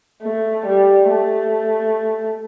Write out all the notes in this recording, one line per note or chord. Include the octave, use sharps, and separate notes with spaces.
A3
G3
A3